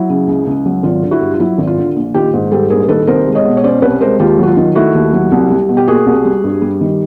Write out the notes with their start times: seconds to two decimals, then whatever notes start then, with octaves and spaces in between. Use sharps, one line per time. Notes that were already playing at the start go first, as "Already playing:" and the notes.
Already playing: F#3 E4
0.09 C#3
0.27 C#2
0.47 C#2
0.66 F#3
0.83 G#1 F4
1.03 D3
1.11 E4 F#4
1.21 G2
1.34 F4
1.40 F#3 E4
1.58 G#1
1.67 F4
1.77 D3
1.96 A#1
2.14 D#3 F4 G4
2.33 G#2
2.51 G3 G4 A4
2.70 A#1 G#4 A#4
2.83 A#4
2.88 D#3 A4 B4
3.07 C2 A#4 C5
3.26 G#3
3.35 C#5 D#5
3.44 B2
3.57 C#5
3.64 C#4 C5 D5
3.82 C2 B4 C#5
4.01 G#3 A#4 C5
4.20 D#2 F4 G4
4.39 F#3 F#4
4.47 F4
4.57 D#3
4.75 A3 E4 F#4
4.95 D#2
5.13 F#3
5.32 C2
5.50 G3
5.69 B2
5.77 G4
5.88 A#3 F#4 G#4
6.06 C2
6.25 G3
6.44 G2
6.62 G3
6.81 D#3